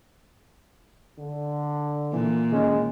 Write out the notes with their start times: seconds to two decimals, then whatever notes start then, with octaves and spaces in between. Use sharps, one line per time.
1.19 D3
2.13 A#2 E3
2.52 D#3 G#3 C#4